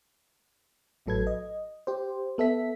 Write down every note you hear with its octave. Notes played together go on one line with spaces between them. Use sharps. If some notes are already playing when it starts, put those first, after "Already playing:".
A1 A2 F#3 A4 B4 G#6
D#5
G4 C5
B3 A4 E5 B6